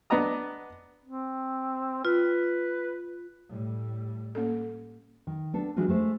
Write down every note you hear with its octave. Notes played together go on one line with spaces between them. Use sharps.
B3 D4 D#5 A#5 D#6
C4
F4 B4
A2 G3
A#3 C#4 A4
D#3
B3 D4 A4
E3 G#3 D4 D#4 F4 F#4
G#3 A3 C5